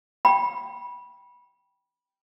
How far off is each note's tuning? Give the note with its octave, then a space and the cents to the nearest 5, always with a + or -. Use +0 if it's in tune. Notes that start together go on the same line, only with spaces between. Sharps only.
G5 +0 B5 -15